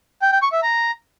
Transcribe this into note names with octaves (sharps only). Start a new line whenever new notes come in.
G5
G5
C#6
E5
A#5